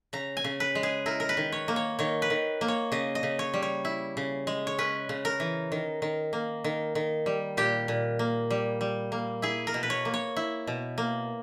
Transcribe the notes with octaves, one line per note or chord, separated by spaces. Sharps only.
C#3 A#5
G#5
C#3
B4
G#3
G#4
E4 A#4
A#4
B4
D#3
C#5
A#3
C#5
D#3 C#5
B4
D#3
A#3
C#5
C#3 D#5
D#5
C#3
C#5
G3
C#5
E4
C#3
G#3
C#5
C#4 B4
C#3
A#4
E3
D#3
D#3
A#3
D#3
D#3
G3
A#2 G4
A#2
A#3
G3
G3
A#3
E4 G#4
A#4
B2
B4
C#5
A#3
C#5
E4
B2
A#3